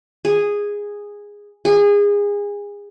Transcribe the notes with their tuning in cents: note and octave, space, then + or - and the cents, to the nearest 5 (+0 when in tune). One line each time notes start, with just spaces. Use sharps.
G#4 -10
G#4 -25